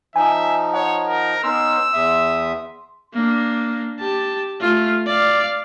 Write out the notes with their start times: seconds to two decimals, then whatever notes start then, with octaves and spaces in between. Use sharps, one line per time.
0.16 F3 D#4 E5 G#5
0.74 C#5 F#5
1.08 A#4
1.44 B3 C#4 D#4 C6 E6
1.93 E2 E5 D#6
3.14 A#3 D4
4.00 G4 A5
4.61 A3 F4
5.06 D5 F5